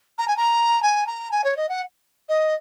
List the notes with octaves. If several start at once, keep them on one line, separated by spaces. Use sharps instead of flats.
A#5
G#5
A#5
G#5
A#5
G#5
C#5
D#5
F#5
D#5